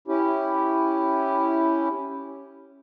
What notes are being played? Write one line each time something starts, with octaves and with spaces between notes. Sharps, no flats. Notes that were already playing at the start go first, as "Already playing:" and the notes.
C#4 E4 G4